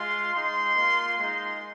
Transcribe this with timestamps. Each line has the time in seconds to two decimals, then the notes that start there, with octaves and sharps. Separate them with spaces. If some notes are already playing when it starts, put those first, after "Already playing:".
Already playing: G#3 F4 C6
0.33 G#3 D#4 C6
0.75 A#3 F4
1.17 G#3 D#4 C6